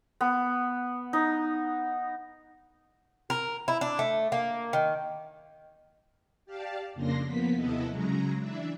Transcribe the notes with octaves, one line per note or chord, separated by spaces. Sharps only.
B3
D#4
A#4
E4
D4
A3
A#3
D#3
G4 D5 F5 A5
F2 C#3 A#3 D4 C6 A#6
F3 A#3 B3 B6
D#2 C3 B3 E4 A4 D#5
C#3 F#3 G#3 A#5
E3 D4 E5